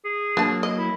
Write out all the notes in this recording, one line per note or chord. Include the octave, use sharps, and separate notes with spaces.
G#4
F#3 A#3 D4 A5
D#5
E4